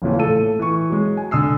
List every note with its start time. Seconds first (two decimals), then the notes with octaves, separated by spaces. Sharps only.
0.02 A1 A#2 C#3 E3 F3
0.18 A2 A4 D#7
0.59 E3 C#6
0.90 F#3 G#3
1.17 G#5
1.31 D3 D#6 E6 C7